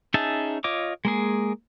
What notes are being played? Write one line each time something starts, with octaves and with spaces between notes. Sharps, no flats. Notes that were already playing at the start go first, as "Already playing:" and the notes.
C#4 D#4 G#4 E5 A5
F4 C#5 D#5 D6
G#3 A#3 G#4